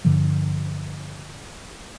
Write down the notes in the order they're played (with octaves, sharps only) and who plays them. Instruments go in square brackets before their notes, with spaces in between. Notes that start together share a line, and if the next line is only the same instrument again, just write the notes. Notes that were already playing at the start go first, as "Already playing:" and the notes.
[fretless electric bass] G2 D3 F3